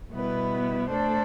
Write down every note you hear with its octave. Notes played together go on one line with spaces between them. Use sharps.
B2 G3 B3 E4 B4
A3 D4 A4 C5